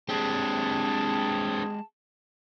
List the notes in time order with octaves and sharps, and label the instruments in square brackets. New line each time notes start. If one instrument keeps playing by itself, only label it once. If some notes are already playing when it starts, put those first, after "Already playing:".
[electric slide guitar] G#3 G4 [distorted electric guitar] C4 D4 [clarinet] G#4 [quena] A5